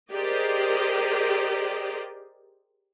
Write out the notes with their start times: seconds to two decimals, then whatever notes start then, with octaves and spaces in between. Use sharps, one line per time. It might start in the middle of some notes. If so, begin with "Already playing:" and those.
0.13 G4 G#4 A#4 C5 D5 D#5